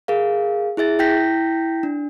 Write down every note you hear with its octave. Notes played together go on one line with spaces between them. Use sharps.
G#4 A#4 F5
E4 G#4 E5 A6
E4 G5 G6 A#6 B6
D4